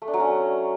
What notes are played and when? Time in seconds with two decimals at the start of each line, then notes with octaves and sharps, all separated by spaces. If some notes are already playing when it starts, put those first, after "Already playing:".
0.02 A3
0.08 D4
0.14 F#3
0.20 C#4